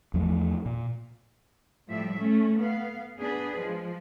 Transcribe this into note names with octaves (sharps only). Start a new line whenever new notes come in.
E2 F3 A3
A#2
A2 F3 G3 E5
A3 C#4
B3 F5
B3 D4 G#4 B4
F3 G#3